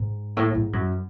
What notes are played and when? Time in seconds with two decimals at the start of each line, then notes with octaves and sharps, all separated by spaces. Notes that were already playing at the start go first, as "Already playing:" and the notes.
Already playing: G#2
0.37 A2
0.55 G#2
0.73 F#2